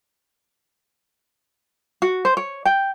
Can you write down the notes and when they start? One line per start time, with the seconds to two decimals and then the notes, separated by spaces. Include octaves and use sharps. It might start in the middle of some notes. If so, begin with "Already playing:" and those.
2.02 F#4
2.25 C5
2.37 C#5
2.65 G5